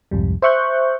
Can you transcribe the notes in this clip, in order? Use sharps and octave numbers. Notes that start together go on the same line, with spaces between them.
C2 F2 G#2 G3
C5 E5 C#6 F#6 G6